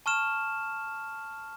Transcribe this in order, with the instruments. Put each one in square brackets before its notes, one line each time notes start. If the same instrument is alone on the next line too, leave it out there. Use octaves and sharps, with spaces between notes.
[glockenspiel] A5 C#6 F6 E7